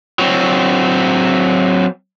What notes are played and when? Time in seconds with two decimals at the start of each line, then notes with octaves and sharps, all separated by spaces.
0.19 F#3 C4